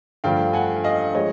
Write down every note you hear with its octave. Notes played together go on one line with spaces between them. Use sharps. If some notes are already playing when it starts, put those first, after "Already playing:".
G2 D3 F3 A3 F5 G5
F#5 G#5
D#5 F5
F3 G#3 C#5 D#5